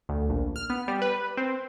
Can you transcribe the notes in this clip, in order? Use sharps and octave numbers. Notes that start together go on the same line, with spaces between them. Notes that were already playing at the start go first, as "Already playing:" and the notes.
D2
A#1
F6
B3
G3
B4
C4